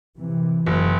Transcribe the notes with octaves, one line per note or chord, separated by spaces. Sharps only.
C3 E3
F#1